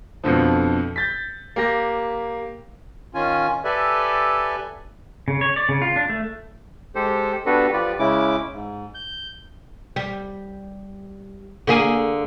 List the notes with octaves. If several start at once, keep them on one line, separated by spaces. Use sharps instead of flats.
F2 B2 D3 F3
G6 A6 B6
A#3 G4 A#6
D#3 C#4 F4 G#5
G4 A4 B4 D5 E5 G#5
C#3
C#5
D5
C#3
F4
D4
A3
G#3 G4 A4 C5
B3 D4 F#4 G4 A4 B4
F3 F4 G4 B4 D5
C#3 G#3 C#4 E4 D6
G#2
G6
G3
D3 A#3 G#4